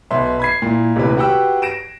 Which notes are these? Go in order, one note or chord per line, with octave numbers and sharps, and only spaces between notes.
B1 B4 E5 C6
B5 G#6 C7
A#2 E4
D#1 D2 C3 E4 B4
F#4 G4 B4 F#5 G5 E6
A#6 D7 E7